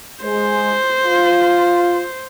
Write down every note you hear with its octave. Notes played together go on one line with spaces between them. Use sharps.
G#3 C5
F4